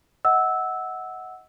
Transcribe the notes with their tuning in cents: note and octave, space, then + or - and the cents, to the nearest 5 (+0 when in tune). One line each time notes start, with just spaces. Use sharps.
D#5 +30 F#5 +0 E6 -10